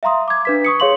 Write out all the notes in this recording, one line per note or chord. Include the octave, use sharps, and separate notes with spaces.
E5 F5 A#5 C6 D#6
D6 G#6
D4 B4 B6
C#6 D#6 C#7
G#4 C#5 F5 C6 F#7